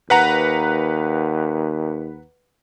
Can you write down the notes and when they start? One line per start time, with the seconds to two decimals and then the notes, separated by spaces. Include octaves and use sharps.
0.10 D#2 B4 F#5 A#5